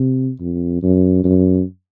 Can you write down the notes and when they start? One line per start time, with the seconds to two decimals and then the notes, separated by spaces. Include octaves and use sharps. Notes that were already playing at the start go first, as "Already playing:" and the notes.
Already playing: C3
0.40 F2
0.83 F#2
1.24 F#2